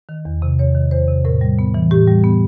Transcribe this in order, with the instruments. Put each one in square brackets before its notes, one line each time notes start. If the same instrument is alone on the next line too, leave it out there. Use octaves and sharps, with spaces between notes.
[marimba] D#3
E2
C3
E2 C#5
D#3
E2 C5
C3
A2 A#4
G3
B3
E3
A2 G4
G3
B3